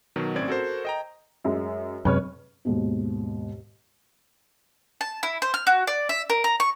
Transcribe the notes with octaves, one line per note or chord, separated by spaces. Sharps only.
B2 D#3 F#3
G#1 A2 C4 C#4 D5 G#6
F#4 A4 A#4 C5
D#5 G5 A#5
F#2 G#3
F#2 C3 G#3 B4 C#5 F6
D#2 G#2 B2
A5
E4
C5
F6
F#4
D5
E5
A#4
A#5
C#6